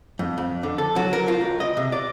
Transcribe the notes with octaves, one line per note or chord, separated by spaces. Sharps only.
F2
F2
D3
A4
F#3
A#4
F4
C#2
D#5
C3
D5